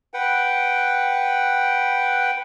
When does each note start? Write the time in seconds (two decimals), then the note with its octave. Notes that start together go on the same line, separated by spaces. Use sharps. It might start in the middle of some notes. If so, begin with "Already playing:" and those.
0.14 B4 F#5 G5